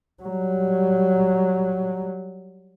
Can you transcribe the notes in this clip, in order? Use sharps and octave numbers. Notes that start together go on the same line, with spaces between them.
F#3 G3